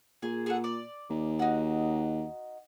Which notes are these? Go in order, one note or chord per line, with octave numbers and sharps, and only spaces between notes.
A#2 G#4
G#4 A4 F#5
D5
D#2
D#4 F#4